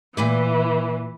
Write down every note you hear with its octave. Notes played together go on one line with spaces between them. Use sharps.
A#2 E3 B4 D5